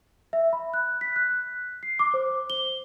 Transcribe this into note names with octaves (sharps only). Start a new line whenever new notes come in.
E5
B5
F#6
B6
F#6
C7
D6
C5
G7